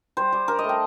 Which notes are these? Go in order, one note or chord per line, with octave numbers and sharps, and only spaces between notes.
G3 C5
G3
D4 A#4
D#5
A3
G5